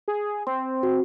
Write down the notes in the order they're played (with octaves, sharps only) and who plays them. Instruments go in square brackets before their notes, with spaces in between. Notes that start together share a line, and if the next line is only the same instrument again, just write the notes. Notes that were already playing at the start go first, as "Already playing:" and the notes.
[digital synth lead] G#4
[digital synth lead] C4 [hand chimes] C6
[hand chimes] F#4